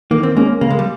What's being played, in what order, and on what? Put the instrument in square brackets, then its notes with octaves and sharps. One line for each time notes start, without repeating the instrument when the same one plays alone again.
[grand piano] D#3 [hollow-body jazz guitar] A#3
[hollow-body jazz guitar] C4
[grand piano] G#3 C#4 [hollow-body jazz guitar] A#3
[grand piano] C#3 [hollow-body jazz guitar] A#3
[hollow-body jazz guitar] G#3
G3